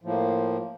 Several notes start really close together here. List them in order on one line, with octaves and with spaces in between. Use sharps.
A2 F3 A#3